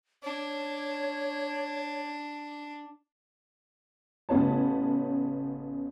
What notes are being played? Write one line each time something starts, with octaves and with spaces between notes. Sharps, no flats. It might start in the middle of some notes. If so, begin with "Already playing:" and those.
D4 C#5
A1 C#3 B3 C#5 A5